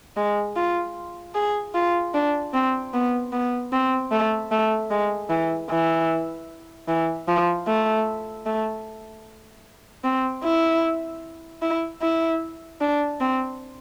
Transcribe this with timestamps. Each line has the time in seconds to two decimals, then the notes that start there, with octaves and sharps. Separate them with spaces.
0.17 G#3
0.56 F4
1.35 G#4
1.75 F4
2.14 D4
2.54 C4
2.94 B3
3.33 B3
3.72 C4
4.12 A3
4.51 A3
4.90 G#3
5.30 E3
5.70 E3
6.88 E3
7.28 F3
7.67 A3
8.46 A3
10.05 C4
10.44 E4
11.62 E4
12.02 E4
12.81 D4
13.20 C4